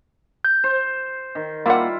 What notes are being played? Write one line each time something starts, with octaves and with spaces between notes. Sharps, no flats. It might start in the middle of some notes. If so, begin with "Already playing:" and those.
G6
C5
D#3
G3 A#3 E4 F4 F#5